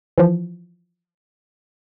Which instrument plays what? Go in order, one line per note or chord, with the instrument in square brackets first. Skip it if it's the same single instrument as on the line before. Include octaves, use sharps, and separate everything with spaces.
[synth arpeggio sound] E3 F3